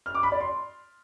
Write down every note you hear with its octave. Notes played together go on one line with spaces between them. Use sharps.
F6
D6
B5
D5
C6